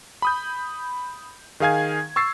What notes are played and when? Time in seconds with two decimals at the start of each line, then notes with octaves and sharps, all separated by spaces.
0.22 B5 D#6 G6
1.60 D#3 G#4 F5 G#5 G#6
2.16 C#6 E6 A6 C7